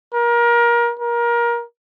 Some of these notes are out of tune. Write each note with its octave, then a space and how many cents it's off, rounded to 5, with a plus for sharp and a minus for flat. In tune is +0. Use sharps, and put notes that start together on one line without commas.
A#4 +25
A#4 +25